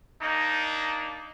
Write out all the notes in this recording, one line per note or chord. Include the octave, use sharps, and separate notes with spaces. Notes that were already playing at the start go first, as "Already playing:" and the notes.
A#3 D4 D#4